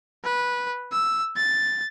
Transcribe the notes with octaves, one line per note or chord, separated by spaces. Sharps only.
B4
E6
A6